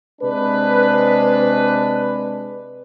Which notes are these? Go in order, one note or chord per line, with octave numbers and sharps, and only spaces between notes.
C3 G#3 D4 B4